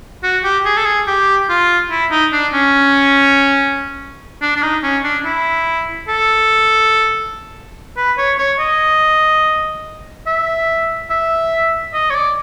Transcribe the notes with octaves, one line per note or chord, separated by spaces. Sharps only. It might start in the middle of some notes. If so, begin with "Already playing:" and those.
F#4
G4
G#4
A4
G#4
G4
F4
E4
D#4
D4
C#4
D4
D4
D#4
C#4
D4
E4
A4
B4
C#5
C#5
D#5
E5
E5
D#5
C#5
D5